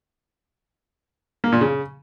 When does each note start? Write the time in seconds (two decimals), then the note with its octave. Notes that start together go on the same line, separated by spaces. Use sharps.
1.44 A#3
1.52 A#2
1.61 C#3